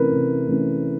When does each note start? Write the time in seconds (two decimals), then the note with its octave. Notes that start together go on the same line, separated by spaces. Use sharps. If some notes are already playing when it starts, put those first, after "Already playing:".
Already playing: C3 E3 A3 C#4 A#4 B4
0.11 C3
0.48 E3 A3 C#4